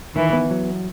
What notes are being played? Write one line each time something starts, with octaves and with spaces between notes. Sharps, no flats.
D#3 E3
B3
F#3